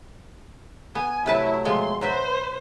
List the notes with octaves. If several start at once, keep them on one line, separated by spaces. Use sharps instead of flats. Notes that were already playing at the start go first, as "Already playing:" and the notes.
B3 G#5
C3 F#3 A3 E4 B4 A5
B2 F3 G#3 C6
F#3 F#4 B4 C5 E5